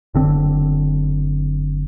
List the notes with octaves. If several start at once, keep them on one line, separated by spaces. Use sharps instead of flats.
F#1 D3 C4